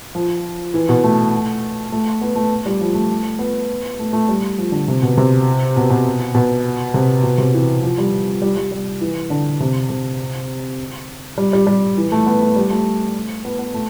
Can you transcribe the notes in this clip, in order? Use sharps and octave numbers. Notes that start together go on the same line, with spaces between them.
F3
E3
B2
A3
A3
B3
A3
G3
F3
A3
B3
A3
A3
G3
F3
D3
C3
B2
C3
B2
B2
B2
C3
B2
C3
E3
F3
G3
G3
G3
G3
E3
D3
C3
C3
G3
G3
G3
E3
A3
B3
A3
G3
A3
B3
B3
A3